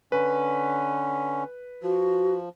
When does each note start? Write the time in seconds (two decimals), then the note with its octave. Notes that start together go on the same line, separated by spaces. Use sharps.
0.12 D3 C#4 B4
1.83 F3 F#4